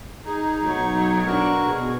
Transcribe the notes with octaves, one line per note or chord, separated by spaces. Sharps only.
D#4 G#4
B1 F#3 C#5
D4 F#4 A#4 C#6
B2 G#4